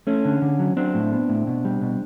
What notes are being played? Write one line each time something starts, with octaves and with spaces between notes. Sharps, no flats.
A3 C#4
D3
D3
F#3
F#3 C4 D4
A2
B3
A2
B2
G3
B2